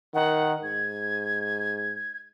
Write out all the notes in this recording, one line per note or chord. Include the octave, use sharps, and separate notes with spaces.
D#3 F#5
G#2 G#6